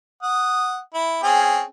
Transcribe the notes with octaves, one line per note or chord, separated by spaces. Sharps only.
F#5 D#6
E4
C4 C#4 G#4